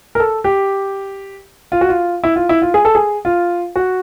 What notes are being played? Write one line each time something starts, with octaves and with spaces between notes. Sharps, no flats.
A#4
A4
G4
F4
F#4
F4
E4
F4
E4
F4
G#4
A4
G#4
F4
F#4